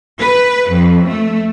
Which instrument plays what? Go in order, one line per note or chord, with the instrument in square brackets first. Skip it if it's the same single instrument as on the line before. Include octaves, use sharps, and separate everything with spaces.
[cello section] B4
F2
A3